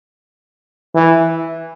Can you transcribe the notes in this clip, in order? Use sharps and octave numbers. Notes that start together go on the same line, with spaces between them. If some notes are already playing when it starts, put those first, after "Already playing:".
E3